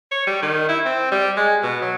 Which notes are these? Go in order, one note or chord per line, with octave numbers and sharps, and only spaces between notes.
C#5
G3
D#3
E4
C4
G3
G#3
B2
F#3